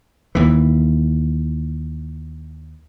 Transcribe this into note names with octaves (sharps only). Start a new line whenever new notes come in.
D#2 E3